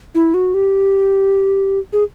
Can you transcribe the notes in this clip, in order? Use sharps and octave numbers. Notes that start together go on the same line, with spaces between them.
E4
F#4
G4
G#4